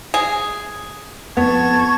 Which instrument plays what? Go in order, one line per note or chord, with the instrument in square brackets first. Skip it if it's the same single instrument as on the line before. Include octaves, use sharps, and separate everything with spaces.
[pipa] G#4
[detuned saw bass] F2 [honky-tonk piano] B3 [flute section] A5 C#6 G#6